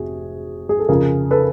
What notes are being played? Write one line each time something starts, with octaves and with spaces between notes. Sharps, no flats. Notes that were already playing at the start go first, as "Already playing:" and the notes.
Already playing: F1 C3 F#4 G#4
G#4
A4
F2 C#3 F3 G#4 A#4
A4 B4